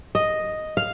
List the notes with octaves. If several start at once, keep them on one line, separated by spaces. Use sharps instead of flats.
D#5
F5